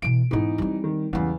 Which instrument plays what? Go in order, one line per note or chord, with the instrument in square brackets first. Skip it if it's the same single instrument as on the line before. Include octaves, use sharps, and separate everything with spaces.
[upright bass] B2 E3 [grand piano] D7
[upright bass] G#2 B3 [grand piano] E3 D#4
[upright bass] G3 C4
[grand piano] D#3
[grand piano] E2 C#3 [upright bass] G3 G#3